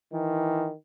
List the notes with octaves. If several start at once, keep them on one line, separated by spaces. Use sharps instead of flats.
D#3 E3